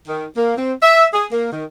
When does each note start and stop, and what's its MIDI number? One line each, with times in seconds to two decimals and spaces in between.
0.07 0.25 51
0.36 0.54 58
0.56 0.72 60
0.82 1.06 76
1.14 1.26 68
1.32 1.49 58
1.52 1.64 51